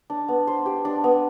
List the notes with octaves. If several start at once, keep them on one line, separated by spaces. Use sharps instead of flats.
D4
B3
C5
G4
D4
B3